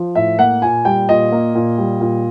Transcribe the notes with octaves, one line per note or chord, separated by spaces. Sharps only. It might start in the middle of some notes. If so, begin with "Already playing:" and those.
Already playing: F3
A2 E5
A#3 F#5
A#2 G#5
G3 G5
A#2 D#5
A#3
A#2
G3
A#2